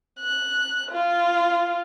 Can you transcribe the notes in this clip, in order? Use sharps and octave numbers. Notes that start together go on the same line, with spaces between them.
F#6
F4